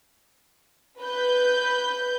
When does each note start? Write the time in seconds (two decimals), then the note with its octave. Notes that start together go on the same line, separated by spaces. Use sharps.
1.01 B4 G6